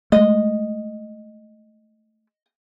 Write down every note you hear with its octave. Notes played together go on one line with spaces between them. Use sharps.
G#3 A3 D#5